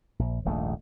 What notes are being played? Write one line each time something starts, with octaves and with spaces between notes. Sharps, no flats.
A#1
D#1 A#1 G#2 A3